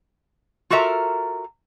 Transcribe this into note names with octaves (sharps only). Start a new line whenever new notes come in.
F4 F#4 A4 A#4 E5 A#5